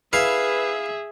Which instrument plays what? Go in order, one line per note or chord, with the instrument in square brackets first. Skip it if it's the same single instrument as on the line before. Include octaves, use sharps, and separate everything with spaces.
[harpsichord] E4 F5 [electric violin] G#4 E5 [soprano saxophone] B4